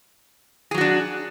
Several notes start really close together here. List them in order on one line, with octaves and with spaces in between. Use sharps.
G#4 F#3 F#4 D4